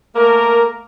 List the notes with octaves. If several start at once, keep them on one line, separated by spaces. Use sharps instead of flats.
A3 A#3 A#4